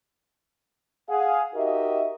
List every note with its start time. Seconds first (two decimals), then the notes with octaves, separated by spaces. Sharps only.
1.09 G#4 F5 F#5
1.54 D#4 F#4 G4 A#4 D#5 E5